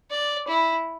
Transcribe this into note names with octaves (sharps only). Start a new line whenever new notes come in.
D5
E4